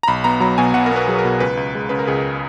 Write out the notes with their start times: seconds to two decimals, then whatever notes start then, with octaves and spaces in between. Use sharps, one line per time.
0.03 A#5
0.08 B1 B5
0.24 B3 A#5
0.40 F#3 A#5
0.58 B2 G#5
0.74 B1 F#5
0.86 A#4
0.92 B3 B4
1.08 F#3 G#4
1.18 A#4
1.25 B2
1.40 C#2 B4
1.57 C#2
1.75 G#3
1.89 C#3 B4
1.99 A#4
2.07 C#2 G#4